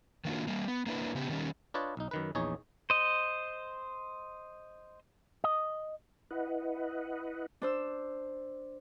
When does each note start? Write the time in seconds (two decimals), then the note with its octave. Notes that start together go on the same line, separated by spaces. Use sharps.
0.25 D#3 F#3 A#3 D4 F4 F#4
0.47 G3 A#3
0.68 B3
0.86 A#3 D4 E4 B4
1.15 C#3 B3 G4
1.29 D#3 G3 C#4
1.74 D4 F4 B4 C#5 D#5 A5
1.97 B1 D#4
2.11 F#2 D#3 B4
2.35 A#1 E2 D#4 G#4 C#5
2.90 C5 D#5
5.44 D#5
6.31 E4 B4 D#5 F#5
7.62 D4 C5 E6